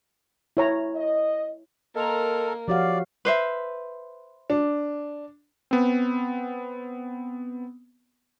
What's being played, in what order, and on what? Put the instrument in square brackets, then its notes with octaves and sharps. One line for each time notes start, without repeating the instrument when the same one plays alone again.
[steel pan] E4 C#5 A#5
[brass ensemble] D#5
[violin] A#3 [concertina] A4 A#4 [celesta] D#5 C6 F7
[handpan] F3 F#4 F5 [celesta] G4 C#5 F#5 [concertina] D5
[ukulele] B4 C5 E5
[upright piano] D4
[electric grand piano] B3 C4